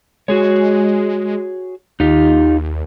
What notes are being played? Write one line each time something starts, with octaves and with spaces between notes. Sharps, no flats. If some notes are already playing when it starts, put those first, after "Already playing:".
G#3 F#4 G#4 C#5
D#2 D#4 F4 G4